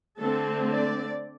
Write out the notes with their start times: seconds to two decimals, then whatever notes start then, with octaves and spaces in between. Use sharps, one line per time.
0.19 D3 A3 C4 A4
0.71 D5